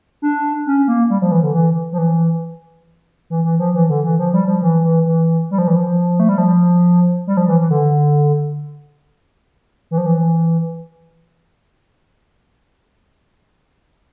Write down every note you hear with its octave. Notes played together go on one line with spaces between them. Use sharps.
D4
C#4
A#3
G3
F3
E3
D3
E3
F3
E3
E3
E3
F3
E3
D3
E3
F3
G3
F3
E3
E3
E3
G3
F3
E3
F3
A3
G3
F3
G3
F3
E3
E3
D3
E3
F3
E3